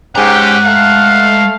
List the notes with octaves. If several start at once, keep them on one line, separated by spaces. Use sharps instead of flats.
G#2 G#3 C#4 G4 F#5 A#5
A3 F5